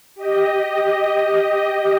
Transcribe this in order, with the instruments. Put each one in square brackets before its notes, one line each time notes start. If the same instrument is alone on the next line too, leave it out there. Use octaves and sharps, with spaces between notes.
[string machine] G4 D#5